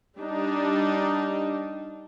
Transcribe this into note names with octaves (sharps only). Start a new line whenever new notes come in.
G3 D4 D#4